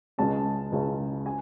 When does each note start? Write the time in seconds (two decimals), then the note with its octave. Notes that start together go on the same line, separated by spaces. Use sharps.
0.18 C#2 C#3 G#3 C#4 A5
0.72 C#2 C#3 G#3 C#4
1.26 G#5